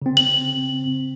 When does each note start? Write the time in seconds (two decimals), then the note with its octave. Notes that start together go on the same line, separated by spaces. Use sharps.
0.02 C#3 C4
0.17 F#7